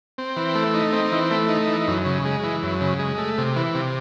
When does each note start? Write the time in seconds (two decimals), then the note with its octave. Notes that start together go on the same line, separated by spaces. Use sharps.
0.18 C4
0.36 E3
0.55 A3
0.74 D#4
0.93 C4
1.12 E3
1.31 A3
1.49 D#4
1.67 E3
1.87 F#2
2.05 C#3
2.25 G#3
2.43 E3
2.63 F#2
2.81 C#3
2.99 G#3
3.18 A3
3.38 C3
3.56 E3
3.75 C3